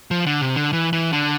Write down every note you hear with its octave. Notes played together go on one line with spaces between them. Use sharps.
F3
D3
C3
D3
E3
E3
D3